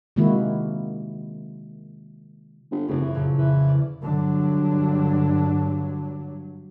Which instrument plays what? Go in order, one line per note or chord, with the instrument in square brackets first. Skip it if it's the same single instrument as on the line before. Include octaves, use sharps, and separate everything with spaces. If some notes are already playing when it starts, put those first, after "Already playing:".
[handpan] C3 D#3 G#3 A#3 E4 F#4
[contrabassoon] G1
[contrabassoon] F1 [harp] F#2 C#3
[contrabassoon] E3
[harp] F2 A#2 C#3
[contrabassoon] E3 [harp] B4
[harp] D5 F6
[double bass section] G2 F#3 [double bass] D3 D4